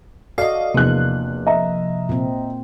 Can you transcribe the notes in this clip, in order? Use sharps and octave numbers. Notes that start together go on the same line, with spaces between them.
F#4 A4 D5 D#5 F5 C7
E2 C3 F3 A#3 D4 F#6
D#5 E5 A#5
A#2 C4